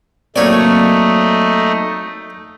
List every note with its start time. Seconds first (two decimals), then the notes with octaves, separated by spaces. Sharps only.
0.36 F#3 A3 A#3 C4 D#4 C#5 D5